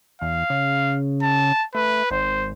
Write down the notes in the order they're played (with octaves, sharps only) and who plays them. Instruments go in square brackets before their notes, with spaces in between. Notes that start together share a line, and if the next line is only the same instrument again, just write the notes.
[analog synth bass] E2 [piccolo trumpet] F5
[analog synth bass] C#3
[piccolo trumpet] A5
[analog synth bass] A3 [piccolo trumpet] B4
[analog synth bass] G#1 [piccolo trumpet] C5